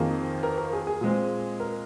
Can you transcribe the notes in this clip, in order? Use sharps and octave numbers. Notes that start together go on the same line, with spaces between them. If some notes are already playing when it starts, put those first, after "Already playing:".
Already playing: F2 D#3 A#3 G#4
A#4
A#4
G#4
G#4
A#2 G#3 C4
A#4